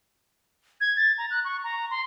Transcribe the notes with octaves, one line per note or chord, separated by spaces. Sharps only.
G#6
A6
A#5
F#6
C#6
A#5
C6